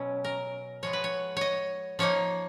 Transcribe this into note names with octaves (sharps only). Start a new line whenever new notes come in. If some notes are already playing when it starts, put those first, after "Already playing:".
Already playing: B2 F#3 C#4 C#5
A#4
F3 G#3 B3 C#5
B4
C#5
C#5 D#5
F3 A#3 D#4 C#5